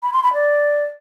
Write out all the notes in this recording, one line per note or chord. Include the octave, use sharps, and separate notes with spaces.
B5
C6
B5
D5